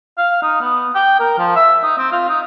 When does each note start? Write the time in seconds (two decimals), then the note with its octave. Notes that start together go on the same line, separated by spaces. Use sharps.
0.18 F5
0.43 D#4
0.61 B3
0.95 G5
1.20 A#4
1.39 F3
1.56 E5
1.83 D#4
1.98 C4
2.12 F4
2.29 D#4